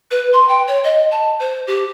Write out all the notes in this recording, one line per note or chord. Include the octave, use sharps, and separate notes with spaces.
B4
C6
G5
C#5
D#5
A5
C5
G4